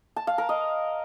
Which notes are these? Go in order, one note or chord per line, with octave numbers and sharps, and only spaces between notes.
A5
F5
A#4
D#5